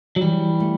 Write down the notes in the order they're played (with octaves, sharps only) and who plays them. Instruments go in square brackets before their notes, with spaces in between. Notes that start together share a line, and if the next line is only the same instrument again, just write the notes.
[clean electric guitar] F#3
[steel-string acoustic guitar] E3 [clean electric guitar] G3
[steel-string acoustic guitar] A3